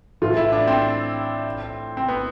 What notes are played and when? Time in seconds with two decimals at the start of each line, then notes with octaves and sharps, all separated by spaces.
0.22 A2 E3 A3 F4
0.37 E4
0.52 D4
0.67 C4
1.97 C4
2.08 B3